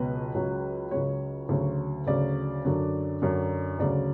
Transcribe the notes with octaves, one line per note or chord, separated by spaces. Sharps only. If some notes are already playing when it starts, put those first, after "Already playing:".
Already playing: C#2 B2 F#3 B4
C#2 C#3 F#3
C#2 C#3 F#3 C#5
D2 C#3 F#3
D2 C#3 F#3 D5
F#2 D3 F#3
F#2 D3 F#3
D2 C#3 F#3 D5